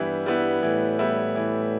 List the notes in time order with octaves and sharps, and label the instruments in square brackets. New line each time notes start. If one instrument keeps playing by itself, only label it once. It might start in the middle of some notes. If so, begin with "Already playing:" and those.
Already playing: [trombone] G2 [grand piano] E3 G3 B3 E4
[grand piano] G3 B3 E4
[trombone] A2 [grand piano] E3
[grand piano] G3 B3 E4
E3